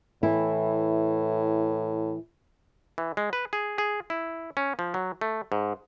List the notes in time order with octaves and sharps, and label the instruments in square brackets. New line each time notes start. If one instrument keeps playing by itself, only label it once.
[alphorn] A2 [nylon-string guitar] E3 E4
[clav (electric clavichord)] E3
G#3
B4
G#4
G#4
E4
C#4
F3
F#3
A3
G#2